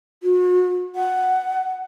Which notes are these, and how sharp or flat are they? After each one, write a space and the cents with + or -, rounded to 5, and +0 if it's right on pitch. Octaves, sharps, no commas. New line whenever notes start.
F#4 -35
F#5 +10